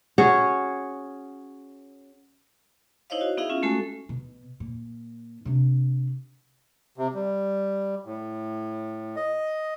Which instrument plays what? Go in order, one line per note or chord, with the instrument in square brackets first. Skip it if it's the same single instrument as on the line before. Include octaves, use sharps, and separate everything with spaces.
[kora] C#4 F#4 G#4 C#5
[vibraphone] D#4 E4 C5 C#5 D#5 F5
F#4
B3 D#4 E4 G#4 E5 F5
C#4 F4
G#3 A3 C#4 F#4 A4 G#5
[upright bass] B2
A#2
C3 D4
[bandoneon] C3
G3
A2
D#5